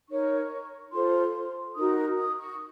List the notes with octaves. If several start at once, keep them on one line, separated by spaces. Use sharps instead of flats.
D#4 A#4 C#5 C#6
F4 A4 C5 C6
D#4 F#4 A#4 D#6
D#6
C#6